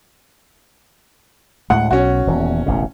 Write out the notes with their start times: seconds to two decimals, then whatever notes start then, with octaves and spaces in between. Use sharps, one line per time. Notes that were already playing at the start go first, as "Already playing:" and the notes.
1.70 D2 A2 G#3 F#5
1.91 B1 C#4 F#4
2.27 D#1 E2
2.66 E1 A1 C#3